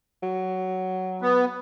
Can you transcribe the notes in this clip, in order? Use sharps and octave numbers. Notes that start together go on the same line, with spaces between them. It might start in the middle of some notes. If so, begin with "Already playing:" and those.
F#3
B3